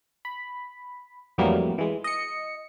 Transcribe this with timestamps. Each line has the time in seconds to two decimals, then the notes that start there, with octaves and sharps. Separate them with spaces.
0.25 B5
1.38 F2 A2 E3 F#3 G3 A#3
1.78 E3 G#3
2.04 D#5 C#7